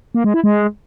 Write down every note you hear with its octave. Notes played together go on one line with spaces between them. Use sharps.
A#3
G#3
E4
G#3